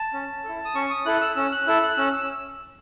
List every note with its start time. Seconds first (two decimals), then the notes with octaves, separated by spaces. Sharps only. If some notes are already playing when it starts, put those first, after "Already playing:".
Already playing: A5
0.13 C#4
0.44 E4 A4
0.65 D#6
0.75 C#4 C#6
0.90 D#6
1.06 E4 A4 F#6
1.21 E6
1.36 C#4 E6
1.52 F#6
1.67 E4 A4 E6
1.83 F#6
1.98 C#4 E6
2.13 E6